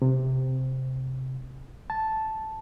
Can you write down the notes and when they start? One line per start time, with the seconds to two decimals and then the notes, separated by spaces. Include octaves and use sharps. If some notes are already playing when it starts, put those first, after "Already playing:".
0.02 C3
1.90 A5